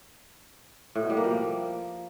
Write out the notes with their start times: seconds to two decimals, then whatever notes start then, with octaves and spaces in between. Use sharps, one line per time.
0.95 A2
1.03 B2
1.10 G3
1.17 A#3
1.24 F3